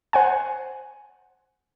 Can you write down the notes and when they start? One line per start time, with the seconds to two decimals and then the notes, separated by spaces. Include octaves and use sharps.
0.13 C5 F#5 G#5